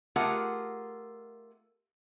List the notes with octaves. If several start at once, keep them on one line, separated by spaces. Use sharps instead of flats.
A3 F4 G4 G#4 A#4 F#5